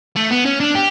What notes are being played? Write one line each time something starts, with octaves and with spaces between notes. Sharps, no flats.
A3
B3
C#4
D4
G4